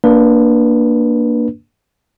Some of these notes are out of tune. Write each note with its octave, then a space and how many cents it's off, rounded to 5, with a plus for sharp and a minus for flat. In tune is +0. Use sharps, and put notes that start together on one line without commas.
A#3 +0 D4 +0 B4 -25